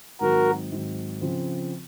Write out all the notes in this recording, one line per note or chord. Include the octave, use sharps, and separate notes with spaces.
G#2 D#3 F#3 C4 F#4 A#4
G#2 D#3 F#3 C4
C#3 F3 C4